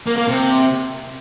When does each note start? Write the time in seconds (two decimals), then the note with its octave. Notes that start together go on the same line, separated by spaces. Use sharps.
0.06 A#3
0.17 A#3
0.28 C3